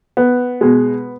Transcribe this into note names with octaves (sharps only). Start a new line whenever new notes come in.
B3
B2 G#3